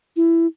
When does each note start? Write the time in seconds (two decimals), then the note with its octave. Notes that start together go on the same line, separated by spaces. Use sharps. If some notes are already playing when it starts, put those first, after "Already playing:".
0.16 E4